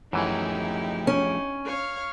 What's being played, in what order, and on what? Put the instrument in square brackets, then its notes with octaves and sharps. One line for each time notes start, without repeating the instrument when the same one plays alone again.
[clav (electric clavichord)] F#2 E3 [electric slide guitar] F3 A3 G#4 [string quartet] D#4 E4 G4
[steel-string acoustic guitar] C#4
[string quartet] C#5 F5 F6